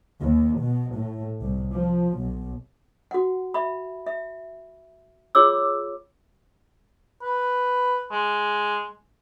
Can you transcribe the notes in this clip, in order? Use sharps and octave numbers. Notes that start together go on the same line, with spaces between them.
D#2
B2
A2
C2
F3
B1
F#4 F#5
E5 B5
E5
F4 G#4 C#5 D6 E6
B4
G#3